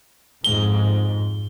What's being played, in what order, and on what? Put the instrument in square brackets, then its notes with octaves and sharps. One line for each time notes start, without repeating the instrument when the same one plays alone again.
[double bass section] F2 G#2 [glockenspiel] G7